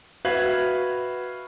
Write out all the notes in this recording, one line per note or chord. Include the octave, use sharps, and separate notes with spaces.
F#4 B4 E5 F5 G#6 F#7